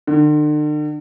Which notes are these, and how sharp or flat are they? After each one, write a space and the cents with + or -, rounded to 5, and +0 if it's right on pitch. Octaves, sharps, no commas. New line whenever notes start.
D3 +40